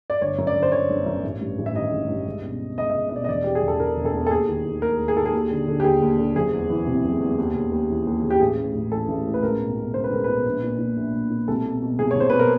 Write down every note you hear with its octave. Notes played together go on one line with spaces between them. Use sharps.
D5
G1 C#5
F#2
D5
G1
C5
D3 C#5
G1
F#2
A1
G2
A1
E5
D#3 D#5
A1
G2
C#2
B2
B2
C#2 D#5
C#2 E5
D#5
B2 D5
D#5
E1 D5
E2 G4
G#4
E1
A4
C#3 A#4
E1
A4
E2
A4
D#2 G#4
D#3
D#3
D#2 A#4
D#2
G#4
D#3 A4
G#4
D#2
D3
D3
G4
D#2 G#4
D#2
D3
F#1 G#4
E2
E3
C3
F#1
E2
D#2
C#3
D#2
E3
D#2
C#3
G4
A1 G#4
A2
A1
E3 A4
A1
A2
B4
C#2 A#4
B2
B2
C#2 C5
B4
C#2 A#4
B2 B4
A#1
A#2
A#2
A#1
A#1
A#2
C2 A4
B2
B2
C2 G#4
C2 C#5
C5
B2 B4
A#4